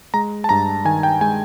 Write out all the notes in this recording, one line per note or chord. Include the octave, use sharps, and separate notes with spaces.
G#3 A#5
A5
G2 A#5
D#3 G#5
G5
G#3 G#5